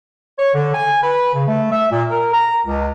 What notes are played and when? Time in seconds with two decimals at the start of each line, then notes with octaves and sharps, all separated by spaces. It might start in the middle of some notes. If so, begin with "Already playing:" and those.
0.38 C#5
0.54 D3
0.74 G#5
1.02 B4
1.34 C#3
1.47 A3
1.71 E5
1.91 A#2
2.10 A#4
2.33 A#5
2.65 C#2